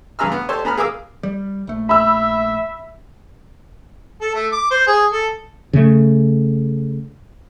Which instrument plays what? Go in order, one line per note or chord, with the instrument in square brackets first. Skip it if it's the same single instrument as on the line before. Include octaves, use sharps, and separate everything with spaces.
[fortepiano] G2 C#3 A#5 E6 F6
B3
G4 A4 C5 C#5
B3 A#5 B5 F6
G#4 A#4 F5 D6 E6
[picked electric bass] G3
A#1 A3
[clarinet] E5 [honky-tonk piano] B5 E6
[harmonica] A4
A3
D6
C5
G#4
A4
[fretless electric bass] C#3 A3